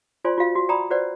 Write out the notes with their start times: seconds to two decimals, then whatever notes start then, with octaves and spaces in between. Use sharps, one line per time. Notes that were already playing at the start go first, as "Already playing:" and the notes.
0.25 F4 C5 D5 G#5 C6
0.38 F4 F#4 F5
0.55 F#4
0.69 D5 G5 A#5 B5 D#6
0.90 F#4 B4 C5 D5 F#5